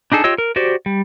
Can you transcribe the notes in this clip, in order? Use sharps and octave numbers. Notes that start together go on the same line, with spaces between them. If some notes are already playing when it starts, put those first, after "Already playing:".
D4 D#4 G#4 A4
F4 G4 C#5 D#5 E6
A#4
F#4 G4 C5 D5
G3